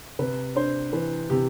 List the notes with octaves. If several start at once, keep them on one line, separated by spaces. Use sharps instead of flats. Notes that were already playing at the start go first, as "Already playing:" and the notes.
C3 B4
D4 C5
E3 B4
C3 G4